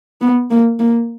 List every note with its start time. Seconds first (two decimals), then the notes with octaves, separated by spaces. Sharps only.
0.21 B3
0.50 A#3
0.80 A#3